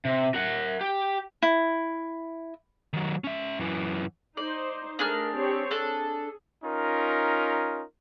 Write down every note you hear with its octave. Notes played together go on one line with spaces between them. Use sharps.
C3
A#4 F#5
G4
E4
D#3 F#3
C#4 E5
F#2 E3
D#4 C5 D5
A3 D4 G#4 A#4 F6
C4 G4 C#5
D4 G#4 A4
C#4 D#4 F4 A#4